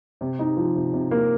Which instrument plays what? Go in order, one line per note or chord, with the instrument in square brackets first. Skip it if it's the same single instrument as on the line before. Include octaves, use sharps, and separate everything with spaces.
[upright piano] C3
D#4
F3
C3
C3
A#3